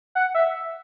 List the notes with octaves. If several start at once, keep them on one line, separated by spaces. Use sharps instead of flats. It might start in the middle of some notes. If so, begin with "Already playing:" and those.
F#5
E5